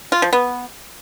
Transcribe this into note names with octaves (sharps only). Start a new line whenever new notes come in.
F4
F3
B3